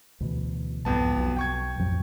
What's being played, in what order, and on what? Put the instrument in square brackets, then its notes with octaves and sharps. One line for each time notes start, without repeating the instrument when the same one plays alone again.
[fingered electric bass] D2 B2 E3
[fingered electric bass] C2 G#2 [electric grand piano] F2 B3 A5
[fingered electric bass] B1
[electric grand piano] G5 C#6 G#6
[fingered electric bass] A1 F2 F#3